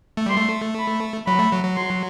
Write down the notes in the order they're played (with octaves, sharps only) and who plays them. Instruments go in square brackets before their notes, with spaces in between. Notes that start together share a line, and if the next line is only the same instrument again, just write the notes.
[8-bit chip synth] A3
[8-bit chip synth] G3 [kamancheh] C6
[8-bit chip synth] A3
[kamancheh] B5
[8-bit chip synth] F#3 [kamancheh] B5
[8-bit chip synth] A3
F#3
F#3
[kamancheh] C6